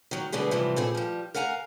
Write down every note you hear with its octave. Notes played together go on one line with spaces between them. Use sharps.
D#3 F#3
B2 D3 G3 B3 G#4
G#2 C3 E3 F3 G3
A#2 C4 G#4 A4
F3 G3
A#4 F5 F#5 G#5 A#5